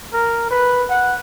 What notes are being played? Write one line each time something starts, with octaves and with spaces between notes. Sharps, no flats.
A#4
B4
F#5